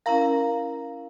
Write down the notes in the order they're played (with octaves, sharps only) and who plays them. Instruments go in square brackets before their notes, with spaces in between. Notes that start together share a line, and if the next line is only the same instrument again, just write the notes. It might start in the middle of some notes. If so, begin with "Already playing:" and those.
[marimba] C#4 E4 A#4 [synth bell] F5 A#5